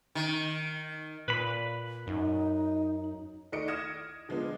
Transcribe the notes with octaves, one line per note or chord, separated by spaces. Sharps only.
D#3
A#2 B4 B5
F#2 D#4
D#3 A3 D5 D#5 C#7 D7
D#6 F6 G#6 A#6 E7
D3 F3 G#3 B3 D4